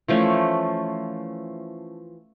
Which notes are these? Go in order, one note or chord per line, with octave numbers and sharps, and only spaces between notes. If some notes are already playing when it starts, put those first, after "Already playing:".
E3 F3 A3 C#4